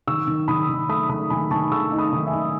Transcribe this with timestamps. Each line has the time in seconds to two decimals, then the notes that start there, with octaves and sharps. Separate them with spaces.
0.07 D#3 C#6 E6
0.27 D#3
0.48 D#3 B5 D#6
0.69 D#3
0.89 A3 B5 D#6
1.09 D#3 B5 D#6
1.30 D#3 G#5 B5
1.51 D#3 A5 C#6
1.71 A3 C#6 E6
1.92 D#4
1.98 B5 D#6
2.13 D#3
2.26 E5 G#5
2.33 D#4